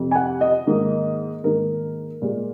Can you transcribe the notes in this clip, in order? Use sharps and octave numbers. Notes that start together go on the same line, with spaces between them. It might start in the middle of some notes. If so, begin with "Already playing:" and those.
Already playing: F2 C3 F3
G#5
F#5
D#5
G#2 D#3 A#3
G#2 D#3 A#3 A#4
A#2 G#3